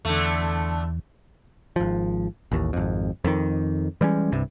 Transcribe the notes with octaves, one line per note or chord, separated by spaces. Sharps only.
E2 D3 A3
G#1 F3
A1 D#2
G#1 F2
F2 D#3
E3 G3 G#3 C#4
C2 G2 C3